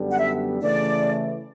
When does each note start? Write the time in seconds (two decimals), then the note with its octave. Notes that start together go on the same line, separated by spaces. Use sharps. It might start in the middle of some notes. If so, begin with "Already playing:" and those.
Already playing: F#2 D3 G3 B3 D4
0.11 F#5
0.18 E5
0.61 C#3 E3 A3 D5